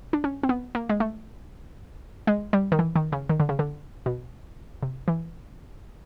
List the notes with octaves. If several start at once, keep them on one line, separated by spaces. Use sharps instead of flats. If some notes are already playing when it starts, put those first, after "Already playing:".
D4
C#4
C4
B3
A#3
G#3
A3
G#3
G3
D#3
E3
D#3
C#3
D#3
D3
C#3
D3
B2
C3
E3